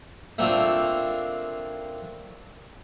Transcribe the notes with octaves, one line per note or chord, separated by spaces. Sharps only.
A3 A#3 C4 D4 F4 A5